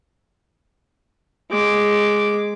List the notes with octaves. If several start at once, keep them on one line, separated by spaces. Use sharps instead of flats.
G#3 D6